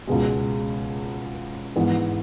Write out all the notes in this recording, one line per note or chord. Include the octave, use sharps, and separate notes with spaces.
C#2 B2 G#3
G#2 E3 B3